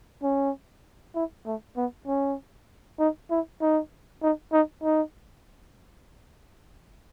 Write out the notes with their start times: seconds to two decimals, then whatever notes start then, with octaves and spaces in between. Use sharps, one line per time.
0.23 C#4
1.15 E4
1.45 A3
1.77 B3
2.07 C#4
2.99 D#4
3.30 E4
3.61 D#4
4.22 D#4
4.53 D#4
4.83 D#4